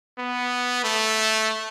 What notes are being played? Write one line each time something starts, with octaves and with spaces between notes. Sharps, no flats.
B3
A3